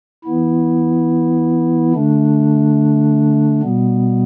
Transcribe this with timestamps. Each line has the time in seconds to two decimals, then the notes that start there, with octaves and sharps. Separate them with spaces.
0.25 E3 B3 E4
1.94 D3 A3 D4
3.62 B2 G3 B3